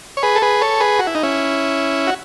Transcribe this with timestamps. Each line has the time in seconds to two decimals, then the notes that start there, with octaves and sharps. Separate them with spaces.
0.17 C#5
0.23 G#4 B4
0.36 A4
0.42 G#4 B4
0.61 A4 C#5
0.80 G#4 B4
0.99 F#4
1.07 E4
1.15 D#4
1.23 C#4 E4
2.07 F#4